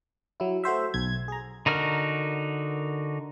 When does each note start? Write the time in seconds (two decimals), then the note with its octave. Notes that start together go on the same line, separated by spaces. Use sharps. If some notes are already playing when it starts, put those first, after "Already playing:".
0.40 F#3 E4
0.64 A3 F#4 C5 E5
0.94 B1 G#6
1.28 G#4 A#5
1.66 D3 D#4 F#4 A#4 F6